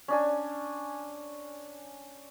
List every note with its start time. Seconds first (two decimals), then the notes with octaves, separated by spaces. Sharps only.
0.08 C#4 D4 G#5